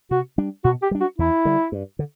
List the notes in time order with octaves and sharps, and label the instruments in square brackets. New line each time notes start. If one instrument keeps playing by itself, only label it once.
[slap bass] C3 [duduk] F#4
[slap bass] G3 D4
[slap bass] B2 [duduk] F#4
[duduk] G4
[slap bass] G3 D4
[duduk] F#4
[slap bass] E2 [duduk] E4
[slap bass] D3 G3
G2
D3